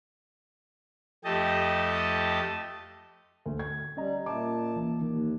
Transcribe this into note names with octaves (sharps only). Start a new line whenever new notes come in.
F2 A3 G4 D#5 A5
D2
G#6
G3 C#4 D#5 A#5
A#2 E5 A5 D6
C2 E3 A#3
D#2 D#3